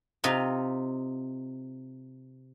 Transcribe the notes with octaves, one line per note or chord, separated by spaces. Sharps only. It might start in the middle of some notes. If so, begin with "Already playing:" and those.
C3 D#4 F4